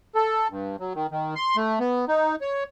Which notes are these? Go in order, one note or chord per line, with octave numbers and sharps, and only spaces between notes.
A4
G2
F#3
D#3
D#3
C6
A3
B3
D#4
C#5